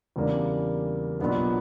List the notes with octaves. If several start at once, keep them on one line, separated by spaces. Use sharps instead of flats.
E2 C#3 G3 A#3 D4
B1 A#2 F#3 B3 D4